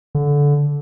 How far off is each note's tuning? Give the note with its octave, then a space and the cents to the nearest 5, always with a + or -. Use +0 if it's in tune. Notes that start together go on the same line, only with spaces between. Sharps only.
D3 -20